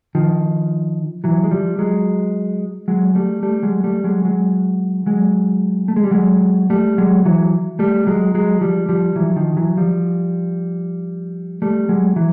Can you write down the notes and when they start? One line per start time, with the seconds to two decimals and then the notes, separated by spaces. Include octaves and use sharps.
0.15 D#3 F3
1.24 E3 F#3
1.44 G#3
1.51 F3 G3
1.79 F#3 G#3
2.88 F#3 G#3
3.15 G3 A3
3.43 G3 A3
3.63 F#3 G#3
3.84 G3 A3
4.04 F#3 G#3
4.25 F#3 G#3
5.06 F#3 G#3
5.88 A3
5.96 G#3
6.04 G3
6.11 F#3 G#3
6.70 G3 A3
6.98 F#3 G#3
7.25 E3 F#3
7.79 G3 A3
8.07 F#3 G#3
8.34 F#3 G#3
8.61 F3 G3
8.89 F3 G3
9.16 E3 F#3
9.36 D#3 F3
9.57 E3 F#3
9.77 F3 G3
11.62 G3 A3
11.89 F#3 G#3
12.16 E3 F#3